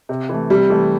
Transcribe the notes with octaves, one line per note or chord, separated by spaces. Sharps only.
C3
E3 A3
C3 G3
E3 A3